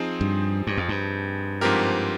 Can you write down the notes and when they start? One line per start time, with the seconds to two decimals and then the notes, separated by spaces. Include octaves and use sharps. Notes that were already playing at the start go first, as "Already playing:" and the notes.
Already playing: F3 C4 D#4 G#4
0.21 G2
0.67 G2
0.77 F2
0.89 G2
1.61 G#2 F3 C4 G4 A#4